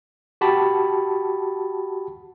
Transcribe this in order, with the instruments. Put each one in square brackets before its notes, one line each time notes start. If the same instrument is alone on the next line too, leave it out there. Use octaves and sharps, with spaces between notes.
[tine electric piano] F#4 G4 A5 B5